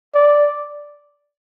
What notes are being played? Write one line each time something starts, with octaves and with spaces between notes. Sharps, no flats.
D5